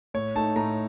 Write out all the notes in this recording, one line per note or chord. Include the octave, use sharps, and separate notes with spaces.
A2 C#5
A3 D#4 A5
A2 A#5